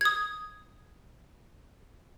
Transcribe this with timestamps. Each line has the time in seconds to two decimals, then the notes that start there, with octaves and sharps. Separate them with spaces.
0.01 D#6 G#6